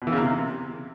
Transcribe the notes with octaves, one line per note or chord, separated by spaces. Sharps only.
B2
E3
C#3
A#3
C3